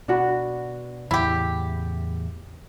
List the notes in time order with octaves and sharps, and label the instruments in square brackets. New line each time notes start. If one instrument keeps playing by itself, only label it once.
[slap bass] B2 [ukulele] D4 F#4 B5
[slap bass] E2 A2 C#3 [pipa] E4 G4